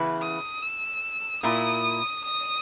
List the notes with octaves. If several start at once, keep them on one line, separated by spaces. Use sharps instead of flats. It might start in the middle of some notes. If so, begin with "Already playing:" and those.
Already playing: C#3 E3 B3 E4 B4
D#6
E6
A#2 A#3 E4 D#6
D#6